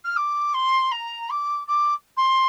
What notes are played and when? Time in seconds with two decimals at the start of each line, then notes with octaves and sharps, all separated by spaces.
0.04 F6
0.16 D6
0.53 C6
0.91 A#5
1.30 D6
1.67 D6
2.16 C6